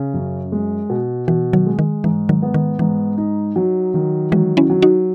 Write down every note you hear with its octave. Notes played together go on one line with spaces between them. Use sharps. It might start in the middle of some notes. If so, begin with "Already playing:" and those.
Already playing: C#3
F#2
G#3
B2
B2 E3
D#3 F#3
G#3
D#3
G#2 E3
D#3 F#3
B3
D#3
G#2 E3
D#4
F#3
D#3
E3 F#3 G#3
C#4 E4
F#3
D#4 F#4